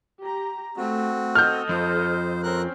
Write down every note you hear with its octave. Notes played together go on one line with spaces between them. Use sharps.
G4 A#5
A3 C4 F#4
A4 D#5 F6 G6
F2 C5
C4 C#4 A#4 F#6